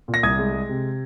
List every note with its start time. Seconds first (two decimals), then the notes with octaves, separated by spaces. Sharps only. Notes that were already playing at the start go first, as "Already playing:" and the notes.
0.08 A#2
0.14 A#6
0.23 C2 D#6 G#6
0.39 G#3
0.53 G#3
0.69 C3